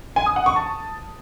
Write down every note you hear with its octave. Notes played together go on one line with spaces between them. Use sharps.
G#5
D#6
F#5
C#6
A5